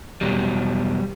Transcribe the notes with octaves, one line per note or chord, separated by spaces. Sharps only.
E2 B2 F#3 G3